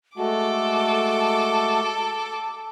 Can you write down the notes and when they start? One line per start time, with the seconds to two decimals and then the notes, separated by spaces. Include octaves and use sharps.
0.18 G#3 A3 F#4 A4 A5 D6